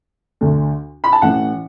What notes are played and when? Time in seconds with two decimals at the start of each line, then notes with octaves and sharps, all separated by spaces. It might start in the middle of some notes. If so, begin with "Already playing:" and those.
0.41 D2 D3 A3
1.04 B5
1.13 A5
1.22 A1 A2 E3 F#5